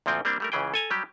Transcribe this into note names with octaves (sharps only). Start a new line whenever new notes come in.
D2 A#2 F3 C4 G5
G3 A#3 C4 D4
G3 A3 A#4
C#2 C#3 E3 G#4 G5
A4 G#5 A#5
F#3 G3 G4